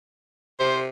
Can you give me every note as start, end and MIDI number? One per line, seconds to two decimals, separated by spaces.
0.60 0.89 48
0.60 0.79 72